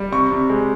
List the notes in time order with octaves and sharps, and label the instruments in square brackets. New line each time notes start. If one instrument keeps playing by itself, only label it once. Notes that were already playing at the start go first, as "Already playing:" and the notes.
Already playing: [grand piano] G3
C3 C#6
C3
G#3